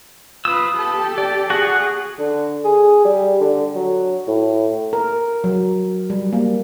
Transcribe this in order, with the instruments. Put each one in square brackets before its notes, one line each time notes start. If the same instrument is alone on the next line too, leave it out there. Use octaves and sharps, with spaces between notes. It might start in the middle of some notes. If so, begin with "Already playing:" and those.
[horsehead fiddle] F4 B4 [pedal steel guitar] D#6 E6
[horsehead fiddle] G4 A4
[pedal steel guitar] D5
[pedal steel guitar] F#4 F#5 [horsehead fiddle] G#4
[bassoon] D3
G#4
G3
D3
F#3
A2
[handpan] A#4
F#3
G3
A#3